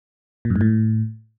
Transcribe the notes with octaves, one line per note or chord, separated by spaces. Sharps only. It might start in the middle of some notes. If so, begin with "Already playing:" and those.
A#2
F#2
G#2
A2